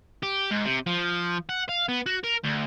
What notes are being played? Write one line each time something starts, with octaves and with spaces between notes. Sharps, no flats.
G4
G#2
C3
F3
F#5
F5
B3
F#4
A#4
D2